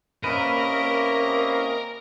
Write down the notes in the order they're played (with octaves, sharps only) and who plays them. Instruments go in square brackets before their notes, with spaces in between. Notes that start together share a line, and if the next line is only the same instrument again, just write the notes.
[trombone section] C3 A#3 [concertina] C#4 D#5 [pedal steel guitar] E4 B4 [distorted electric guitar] A#4